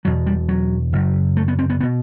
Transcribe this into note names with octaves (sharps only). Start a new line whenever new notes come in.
E1 E2 B2 F#3
G3
F#3
F#1 F#2
A3
B3
C4
B3
B3
B2